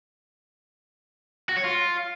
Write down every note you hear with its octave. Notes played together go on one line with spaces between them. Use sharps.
F#4
C#5
F4